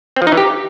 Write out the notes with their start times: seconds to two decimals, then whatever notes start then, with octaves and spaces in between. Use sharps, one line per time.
0.16 C4
0.22 F3
0.27 D#4
0.32 E3
0.37 G4